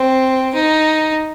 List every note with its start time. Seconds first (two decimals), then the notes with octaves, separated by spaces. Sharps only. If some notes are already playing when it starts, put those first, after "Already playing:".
Already playing: C4
0.55 D#4